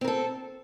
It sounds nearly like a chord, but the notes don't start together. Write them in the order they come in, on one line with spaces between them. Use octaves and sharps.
C4 A#4 A4